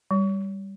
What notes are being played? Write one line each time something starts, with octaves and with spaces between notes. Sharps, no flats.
G3